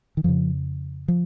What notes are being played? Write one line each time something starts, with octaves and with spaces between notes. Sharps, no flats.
D#3
F2 C#3 F3
F3